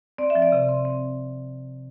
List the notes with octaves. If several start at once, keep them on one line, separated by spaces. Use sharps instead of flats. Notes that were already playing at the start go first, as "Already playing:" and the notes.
C4 D5
E5
F3
D5
C3
C4
C4